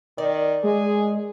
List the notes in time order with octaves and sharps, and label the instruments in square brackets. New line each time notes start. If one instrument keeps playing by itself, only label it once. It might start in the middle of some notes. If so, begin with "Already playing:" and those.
[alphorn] D#3 [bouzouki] D5
[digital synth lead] G#3 [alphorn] G#4